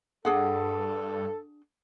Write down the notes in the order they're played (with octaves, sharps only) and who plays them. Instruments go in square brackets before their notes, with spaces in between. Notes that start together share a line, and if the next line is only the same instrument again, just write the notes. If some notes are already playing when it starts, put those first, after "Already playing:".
[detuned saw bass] G2 [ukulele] D4 G#4 F#5 [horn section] A4